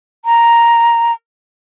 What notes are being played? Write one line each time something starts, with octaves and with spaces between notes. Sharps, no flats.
A#5